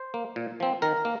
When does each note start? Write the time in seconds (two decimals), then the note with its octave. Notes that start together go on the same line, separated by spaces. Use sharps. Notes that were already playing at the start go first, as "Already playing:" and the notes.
Already playing: C5
0.14 A#3
0.36 A#2
0.60 F3 C4
0.82 D#3 A#4
1.05 A#3